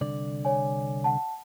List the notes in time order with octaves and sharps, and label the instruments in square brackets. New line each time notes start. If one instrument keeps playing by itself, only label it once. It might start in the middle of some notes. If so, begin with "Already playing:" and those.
[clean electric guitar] C2 D3 D5
[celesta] C#5 G#5
F#5 A5